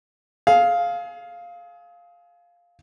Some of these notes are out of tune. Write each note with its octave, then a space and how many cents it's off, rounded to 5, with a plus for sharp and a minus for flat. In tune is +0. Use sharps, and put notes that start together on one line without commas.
G#4 +30 F5 +0